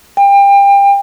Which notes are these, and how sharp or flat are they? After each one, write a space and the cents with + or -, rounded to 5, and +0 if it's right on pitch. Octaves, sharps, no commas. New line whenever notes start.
G5 +30